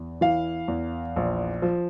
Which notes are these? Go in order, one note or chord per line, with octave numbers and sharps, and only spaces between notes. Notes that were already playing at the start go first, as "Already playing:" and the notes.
Already playing: E2
E3 F5
E2
A#1
F3